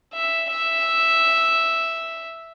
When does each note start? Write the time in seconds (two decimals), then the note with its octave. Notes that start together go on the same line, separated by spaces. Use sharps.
0.14 E5
0.52 E5